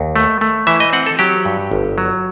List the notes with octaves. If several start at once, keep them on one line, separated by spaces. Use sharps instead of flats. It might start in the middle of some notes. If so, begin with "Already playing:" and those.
Already playing: D#2
A3
A3
E3 E5
D#5
C4 F#5
A4
F#3 G4
G2
G1
F#3